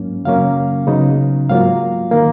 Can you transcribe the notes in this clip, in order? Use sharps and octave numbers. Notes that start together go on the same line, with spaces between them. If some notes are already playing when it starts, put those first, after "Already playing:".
Already playing: G#2 F#3 A#3 C#4
F#2 C#3 F#3 A#3 C#4 F5
C#3 F#3 B3 D#4
G#2 F#3 A#3 F4 F5
D#3 A#3